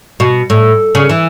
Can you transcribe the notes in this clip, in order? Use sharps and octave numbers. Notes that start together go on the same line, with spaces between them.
B2
A2
C#3
E3